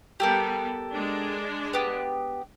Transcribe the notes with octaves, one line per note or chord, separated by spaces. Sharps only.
G3 B3 G4 A4 A#4
G#3 D4
B3 G4